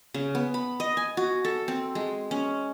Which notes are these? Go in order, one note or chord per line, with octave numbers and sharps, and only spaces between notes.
C#3
B3
B5
D#5
G#5
F#4
A4
C4
G#3
C#4